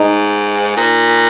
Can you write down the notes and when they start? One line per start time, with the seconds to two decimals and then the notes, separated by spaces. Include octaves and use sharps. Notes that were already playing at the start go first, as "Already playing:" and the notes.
Already playing: G#2 D#4
0.77 A#2